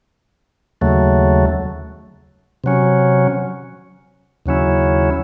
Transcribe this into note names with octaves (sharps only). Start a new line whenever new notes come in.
D#2 C#3 F#3 A3
C3 F#3 C#4
D#2 C#3 F#3 C#4 E4